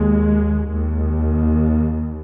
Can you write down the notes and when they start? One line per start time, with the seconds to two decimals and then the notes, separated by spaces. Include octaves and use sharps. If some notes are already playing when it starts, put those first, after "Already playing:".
Already playing: D#2 G#3
0.71 D#2